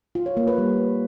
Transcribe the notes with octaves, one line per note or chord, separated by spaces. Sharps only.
F4
C#5
A#3
B4
G3